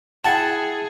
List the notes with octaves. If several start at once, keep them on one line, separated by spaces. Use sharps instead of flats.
E4 G#4 F#5 G5 A5 A6 C#7